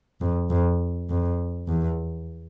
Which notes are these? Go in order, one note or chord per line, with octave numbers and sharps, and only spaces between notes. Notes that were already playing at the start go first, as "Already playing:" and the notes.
F2
F2
F2
E2